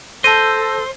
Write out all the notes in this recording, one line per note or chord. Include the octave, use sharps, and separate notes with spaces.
A4 C5 A5 E6 G6 A#6 D#7